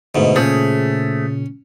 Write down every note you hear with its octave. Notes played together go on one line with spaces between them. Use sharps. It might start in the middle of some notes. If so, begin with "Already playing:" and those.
G#2 B2 D3 A3
A#2 C#3 A3 C#4 G#4 C5